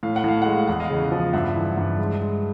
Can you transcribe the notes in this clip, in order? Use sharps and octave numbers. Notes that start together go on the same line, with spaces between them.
A2 F5
F#5
A2 F5
G#3 F#5
F5
E2 F#5
D#5 F5
C#3
F3
G2 E5 F#5
E3
G2
G#3
G#3